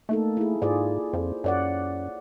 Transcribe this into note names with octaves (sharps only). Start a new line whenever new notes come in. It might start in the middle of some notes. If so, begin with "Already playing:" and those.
A3 A#3 D#4 A4
E4 G#4
G#2 F4 G#4 D5
F2 C5
F#2 C#5 D5 F#5